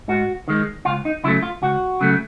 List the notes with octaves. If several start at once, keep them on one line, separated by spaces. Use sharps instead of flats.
G#2 F#4
D#3 G#3
C#2 F4
D#4
C#3 F#3 A3 E4
F4
C#2 F#4
C#3 F#3 A3